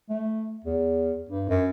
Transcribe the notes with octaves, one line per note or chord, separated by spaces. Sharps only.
A3
E2
G2
F#2